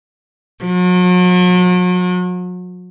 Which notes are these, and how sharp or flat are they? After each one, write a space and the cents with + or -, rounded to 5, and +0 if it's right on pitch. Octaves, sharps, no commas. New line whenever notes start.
F#3 -40